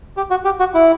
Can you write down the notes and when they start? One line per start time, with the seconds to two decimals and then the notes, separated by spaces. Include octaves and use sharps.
0.17 G4
0.30 F#4
0.45 G4
0.59 F#4
0.74 E4